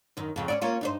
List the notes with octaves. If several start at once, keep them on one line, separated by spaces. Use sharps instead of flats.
F#2 D#3
F2 C#3
C#4 E4 D5
A#3 C#4 F4
G2 D#4 C5